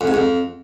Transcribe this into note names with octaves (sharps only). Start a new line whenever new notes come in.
F2
G#2
F2